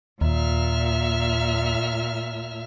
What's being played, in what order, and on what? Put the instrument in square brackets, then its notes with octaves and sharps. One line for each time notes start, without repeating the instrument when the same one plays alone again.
[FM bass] D#2 [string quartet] A#2 E5 F6